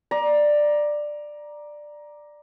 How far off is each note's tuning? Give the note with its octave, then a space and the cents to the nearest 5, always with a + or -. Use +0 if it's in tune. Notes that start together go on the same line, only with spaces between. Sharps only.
D5 +10 A#5 +15